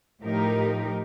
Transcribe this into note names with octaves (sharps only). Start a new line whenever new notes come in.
A2 F3 D#4 G4 A#4